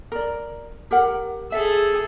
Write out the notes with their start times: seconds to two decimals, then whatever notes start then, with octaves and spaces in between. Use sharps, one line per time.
0.12 A#4 D5
0.91 G4 A#4 F#5
1.52 G#4 A4 E5